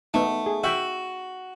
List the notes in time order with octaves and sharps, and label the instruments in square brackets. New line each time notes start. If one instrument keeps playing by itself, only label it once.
[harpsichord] A3 [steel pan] B3 D#4
[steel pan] G#4
[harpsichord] F#4 [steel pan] E5 G5